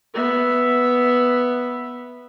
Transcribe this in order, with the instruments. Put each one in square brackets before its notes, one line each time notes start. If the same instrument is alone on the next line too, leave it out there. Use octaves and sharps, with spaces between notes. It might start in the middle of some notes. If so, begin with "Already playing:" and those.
[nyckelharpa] B3 E5